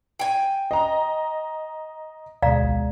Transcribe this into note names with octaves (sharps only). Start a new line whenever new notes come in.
G5 G#5
D#5 A#5
D2 B2 G#3 D5 F5 A#5
A#1